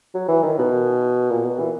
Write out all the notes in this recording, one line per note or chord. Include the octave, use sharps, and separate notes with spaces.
F#3
E3
D#3
B2
A#2
B2
E3